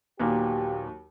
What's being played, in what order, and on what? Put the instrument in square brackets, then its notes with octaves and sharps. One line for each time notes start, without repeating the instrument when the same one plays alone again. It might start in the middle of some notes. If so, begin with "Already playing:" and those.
[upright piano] D#2 F#3 [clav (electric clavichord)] A#2 A#3 B3 [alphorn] G4